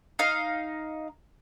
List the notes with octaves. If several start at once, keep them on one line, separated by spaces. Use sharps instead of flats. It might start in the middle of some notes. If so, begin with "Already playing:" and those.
D#4 F5